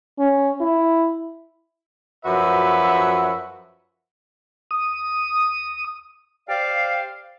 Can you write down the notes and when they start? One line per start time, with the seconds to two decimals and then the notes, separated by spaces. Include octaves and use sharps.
0.18 C#4
0.61 E4
2.24 F#2 F3 F#4 B4 E5
4.71 D#6
6.49 G4 C5 D5 F5